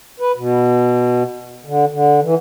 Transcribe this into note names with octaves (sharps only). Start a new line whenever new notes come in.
B4
B2
D3
D3
E3